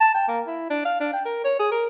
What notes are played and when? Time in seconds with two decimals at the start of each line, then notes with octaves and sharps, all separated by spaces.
0.01 A5
0.14 G5
0.28 A#3
0.47 E4
0.70 D4
0.85 F5
1.00 D4
1.13 G5
1.25 A#4
1.44 C#5
1.59 G#4
1.71 A#4